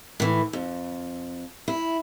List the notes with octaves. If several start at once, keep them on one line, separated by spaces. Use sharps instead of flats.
A2 E3
F2
E4